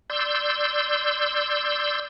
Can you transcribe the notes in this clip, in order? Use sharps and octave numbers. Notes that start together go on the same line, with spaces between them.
D5 C6 E6 G6